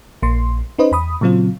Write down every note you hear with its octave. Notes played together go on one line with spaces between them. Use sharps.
A#1 A#3 C6
C#4 D#4 B4 C5 D#5
E2 B5 D#6
A#2 C#3 F#3 C4 F4